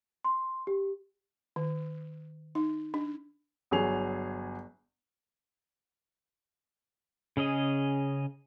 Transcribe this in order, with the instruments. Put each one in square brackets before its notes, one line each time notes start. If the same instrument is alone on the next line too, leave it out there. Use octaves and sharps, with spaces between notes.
[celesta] C6
G4
[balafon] D#3
D#4
D4
[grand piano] G1 F#3 G#4 F7
[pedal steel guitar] C#3 C#4 G#4 D#5